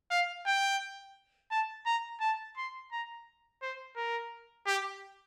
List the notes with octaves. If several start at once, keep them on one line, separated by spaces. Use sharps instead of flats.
F5
G5
A5
A#5
A5
C6
A#5
C5
A#4
G4